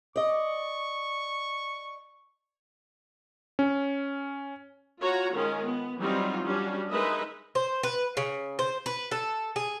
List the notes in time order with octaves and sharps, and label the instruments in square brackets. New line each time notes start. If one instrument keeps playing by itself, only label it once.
[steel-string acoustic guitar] D5 D#5 [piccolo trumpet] C#6
[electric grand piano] C#4
[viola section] F4 F#4 C#5 A#5
D#3 G#3 C#4 F4
B3
E3 F#3 G3 C4 D#4 F4
G3 C#4 D4 F#4
G#3 D#4 A#4 B4 D#5 E5
[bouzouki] C5
B4
C#3
C5
B4
A4
G#4